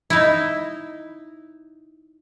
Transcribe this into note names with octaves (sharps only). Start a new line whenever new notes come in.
D#4 E4